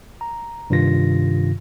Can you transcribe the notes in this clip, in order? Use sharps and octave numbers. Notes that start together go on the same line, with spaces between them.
A#5
G2 C3 D#3 F4 A#6